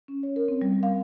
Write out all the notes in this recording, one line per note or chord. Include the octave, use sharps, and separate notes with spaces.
C#4
C#5
A#4
C4
G3
F5